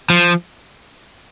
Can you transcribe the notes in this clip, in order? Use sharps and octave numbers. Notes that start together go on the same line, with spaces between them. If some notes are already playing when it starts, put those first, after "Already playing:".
F3